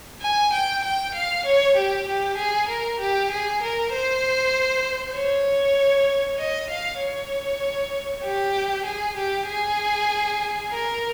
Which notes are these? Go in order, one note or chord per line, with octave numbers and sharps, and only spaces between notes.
G#5
G5
G5
F5
C#5
G4
G4
G#4
A#4
G4
G#4
A#4
C5
C#5
D#5
F5
C#5
G4
G#4
G4
G#4
A#4